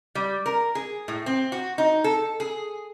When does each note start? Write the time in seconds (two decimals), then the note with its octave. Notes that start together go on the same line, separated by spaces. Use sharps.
0.15 G3
0.46 A#4
0.75 G#4
1.08 A2
1.26 C4
1.52 F#4
1.78 D#4
2.04 A4
2.40 G#4